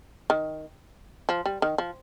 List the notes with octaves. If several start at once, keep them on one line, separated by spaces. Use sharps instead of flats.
D#3
F3
G3
D#3
F3